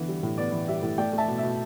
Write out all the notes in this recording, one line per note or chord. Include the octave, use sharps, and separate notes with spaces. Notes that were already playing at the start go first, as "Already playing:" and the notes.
Already playing: D3 E3 B3
G3
A2
B3 D5
E3
G3 E5
A2
A3 D5 G5
A3 E5 A5
B2
B2 E5